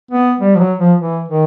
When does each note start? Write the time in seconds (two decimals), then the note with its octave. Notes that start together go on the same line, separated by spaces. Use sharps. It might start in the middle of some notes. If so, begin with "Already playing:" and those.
0.11 B3
0.40 G3
0.56 F3
0.59 F#3
0.79 F3
0.99 E3
1.29 D#3